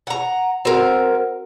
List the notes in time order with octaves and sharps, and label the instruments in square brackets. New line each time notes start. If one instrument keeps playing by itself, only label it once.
[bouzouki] F#5 A#5
[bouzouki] C4 A#4 [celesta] F#4 F#5